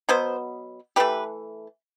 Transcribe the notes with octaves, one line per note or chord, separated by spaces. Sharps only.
B2 F#3 B3 C5
E3 A3 G4 B4